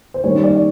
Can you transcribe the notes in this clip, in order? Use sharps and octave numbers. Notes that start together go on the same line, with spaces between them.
C5
D#3 G3 A#3 C#4 C#5
D5